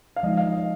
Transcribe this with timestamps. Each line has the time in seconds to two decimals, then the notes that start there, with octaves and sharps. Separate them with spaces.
0.16 F5
0.23 F3 G#3 D#4 D#5
0.37 F5
0.52 D#5